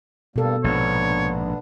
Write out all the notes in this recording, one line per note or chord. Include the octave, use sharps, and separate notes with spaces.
G2 B2 G3 A#3 A4
A#1 G#2 B3 D4 C#5